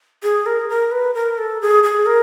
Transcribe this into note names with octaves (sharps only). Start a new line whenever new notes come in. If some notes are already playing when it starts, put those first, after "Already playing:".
G#4
A#4
A#4
B4
A#4
A4
G#4
G#4
A#4